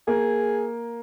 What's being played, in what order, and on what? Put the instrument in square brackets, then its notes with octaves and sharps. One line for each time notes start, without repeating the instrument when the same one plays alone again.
[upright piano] A#3 [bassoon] G#4